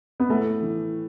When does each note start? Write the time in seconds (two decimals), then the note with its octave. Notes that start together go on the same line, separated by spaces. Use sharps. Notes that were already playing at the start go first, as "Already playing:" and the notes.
0.20 B3
0.29 A2 A3
0.62 E3